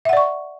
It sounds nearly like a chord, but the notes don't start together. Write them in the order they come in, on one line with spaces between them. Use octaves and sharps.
E5 F#5 D5 C#6